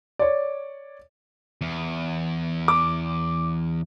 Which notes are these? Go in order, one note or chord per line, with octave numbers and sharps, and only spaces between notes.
C#5 D5
E2
D6